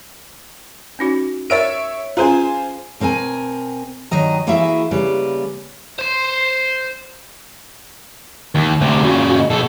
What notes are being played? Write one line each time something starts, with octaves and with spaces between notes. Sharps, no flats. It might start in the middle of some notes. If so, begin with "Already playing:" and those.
C#4 D#4 F#4
A#4 C#5 D5 E5 D7
C#4 F4 G#4 C5 G#5 A#5
B2 C4 A#4 C5 G#5
G2 D#3 F#3 D#5 A#5
E3 A#3 E4 F#4 G#4 E5
C#3 G3 A#3 B4
C5 C6
D#2
D2 C3
A#2 C#3 F#4
D#5
B2 G#4 A4